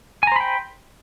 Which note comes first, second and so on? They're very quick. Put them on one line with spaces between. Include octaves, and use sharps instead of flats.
G#5 A#5 C5 B5 G5